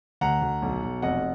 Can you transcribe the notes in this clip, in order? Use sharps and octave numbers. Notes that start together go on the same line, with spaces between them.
D2 F#5 A#5
D2
B1
B1
F1 D#5 F#5